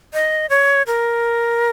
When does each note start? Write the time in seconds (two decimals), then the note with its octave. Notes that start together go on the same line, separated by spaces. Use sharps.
0.13 D#5
0.50 C#5
0.87 A#4